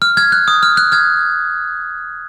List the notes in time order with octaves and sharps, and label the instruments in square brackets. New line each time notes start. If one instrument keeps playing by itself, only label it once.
[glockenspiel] F6
F6 G#6
F#6
D#6
F6
F#6
F6 G#6